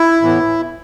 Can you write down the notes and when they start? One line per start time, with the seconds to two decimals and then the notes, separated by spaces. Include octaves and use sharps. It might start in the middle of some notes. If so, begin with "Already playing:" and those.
Already playing: E4
0.22 A2 E3 B3